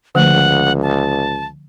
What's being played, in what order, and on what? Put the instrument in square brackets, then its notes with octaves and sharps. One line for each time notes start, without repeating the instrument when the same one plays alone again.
[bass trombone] C#2 [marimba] D3 F3 A3 [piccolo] F#5
[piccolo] A5